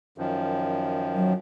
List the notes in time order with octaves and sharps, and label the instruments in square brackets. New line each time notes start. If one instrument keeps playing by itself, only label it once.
[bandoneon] F#2 D#3 F3
[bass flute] F#3